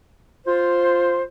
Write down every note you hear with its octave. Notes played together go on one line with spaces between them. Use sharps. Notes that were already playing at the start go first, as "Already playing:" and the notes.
F4 C5